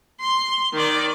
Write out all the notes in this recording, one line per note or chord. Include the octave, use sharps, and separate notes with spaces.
C6
D#3 D5